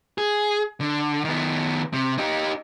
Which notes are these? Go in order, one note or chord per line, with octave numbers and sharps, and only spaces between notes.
G#4
D3
D#3 B3
C3
D#4 G4